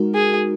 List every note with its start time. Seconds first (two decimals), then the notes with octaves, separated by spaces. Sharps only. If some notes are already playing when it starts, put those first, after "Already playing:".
Already playing: G#3 D#4 F#4 A#4
0.15 G#4